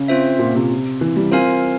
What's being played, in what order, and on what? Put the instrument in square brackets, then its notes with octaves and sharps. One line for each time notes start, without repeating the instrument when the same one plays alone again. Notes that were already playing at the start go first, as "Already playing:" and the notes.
Already playing: [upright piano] C#3
[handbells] C4 F4 C5 E5
[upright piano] A#2
C3
E3
G3
[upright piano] C4 [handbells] F4 A#4 F5 G#5